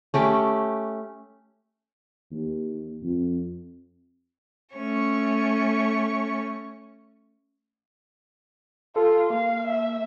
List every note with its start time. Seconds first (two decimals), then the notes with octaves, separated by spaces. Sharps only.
0.14 A3 C#4 G4 B5
2.31 D#2
3.03 F2
4.74 A3 C#4 C#6
8.96 F4 A4
9.30 A#3 F5
9.66 E5